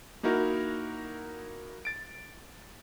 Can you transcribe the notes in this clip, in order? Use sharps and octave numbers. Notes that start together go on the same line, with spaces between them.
A#3 D#4 E4 F#4 A#4
A6 D7